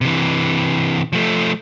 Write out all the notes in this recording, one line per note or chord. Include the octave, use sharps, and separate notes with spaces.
C3 E3
F3 A3